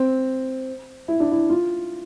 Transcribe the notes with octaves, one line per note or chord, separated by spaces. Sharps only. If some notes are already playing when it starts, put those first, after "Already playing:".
Already playing: C4
E4
D4
E4
F4